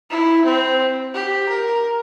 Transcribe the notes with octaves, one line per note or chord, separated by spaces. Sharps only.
E4
C4
G4
A#4